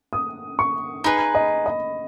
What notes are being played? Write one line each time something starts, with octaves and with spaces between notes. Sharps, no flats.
D#6
C#6
D#4 G#4 B4 B5
D#5
D#5